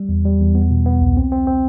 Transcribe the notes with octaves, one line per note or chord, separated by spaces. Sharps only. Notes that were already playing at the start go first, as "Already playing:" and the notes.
Already playing: G3
E2
G3
E2
B3
B2
B3
C2
C4
C4
C4